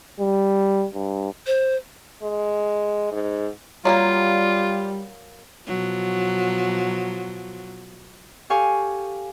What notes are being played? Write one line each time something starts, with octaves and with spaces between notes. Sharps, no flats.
G3
G2
C5
G#3
G#2
F#3 G3 A3 A#3 F4
B2 F3 F#3
G4 A4 F5 G#5 C#6